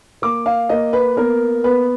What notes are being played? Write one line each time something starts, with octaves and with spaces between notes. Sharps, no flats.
A#3 D6
F5
A#3 D#5
B4
B3 A#4
B3 B4